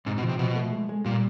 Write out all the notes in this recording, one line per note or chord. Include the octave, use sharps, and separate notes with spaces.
G#2 C3
B2
F3
C3
B2 F3
A3
G#3
G#3
A#2 G3